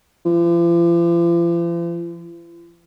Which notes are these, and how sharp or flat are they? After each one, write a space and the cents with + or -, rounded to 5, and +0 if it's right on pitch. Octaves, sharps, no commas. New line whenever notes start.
F3 -45